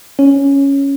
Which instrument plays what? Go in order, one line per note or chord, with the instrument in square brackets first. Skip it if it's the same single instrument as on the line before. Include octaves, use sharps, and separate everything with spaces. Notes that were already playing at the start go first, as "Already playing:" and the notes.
[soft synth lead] C#4